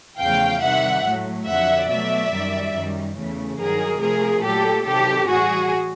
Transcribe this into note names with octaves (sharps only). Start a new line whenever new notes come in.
E2 C#3 F3 A3 F5 G5
C3 D#3 G3 E5 F#5
A2 F#3 A3
F2 D3 F#3 E5 F#5
B2 F#3 A3 D5 E5
F#2 D#3 G3
F#2 D#3 G3
E2 C#3 E3 A3
G2 D#3 F#3 G#4 A#4
C3 F3 A3 G#4 A#4
A#2 F#3 A3 G4 A4
C3 D#3 F#3 G4 A4
A2 E3 G3 F#4 G#4